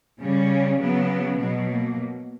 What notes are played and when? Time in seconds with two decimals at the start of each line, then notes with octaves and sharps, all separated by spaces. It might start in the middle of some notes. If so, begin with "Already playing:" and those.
0.21 C#3 G3 C#4
0.80 C#3 F#3 B3
1.39 B2 F#3 B3
1.68 A#3